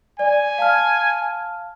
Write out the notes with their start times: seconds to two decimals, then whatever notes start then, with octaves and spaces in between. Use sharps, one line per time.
0.19 D5 G#5
0.58 F5 A5 F6